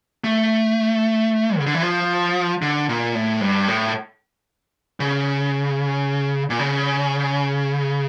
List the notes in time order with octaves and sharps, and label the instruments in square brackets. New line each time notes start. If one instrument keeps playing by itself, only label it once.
[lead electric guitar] A3
C#3
D3
E3
F3
D3
A#2
A2
G2
A2
C#3
A#2
C#3